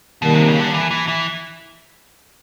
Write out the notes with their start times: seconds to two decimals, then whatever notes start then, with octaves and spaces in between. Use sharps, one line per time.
0.22 B2 D#3 G3 A#3
0.34 C3
0.48 C#3
0.60 D3
0.74 E3
0.91 E3
1.08 E3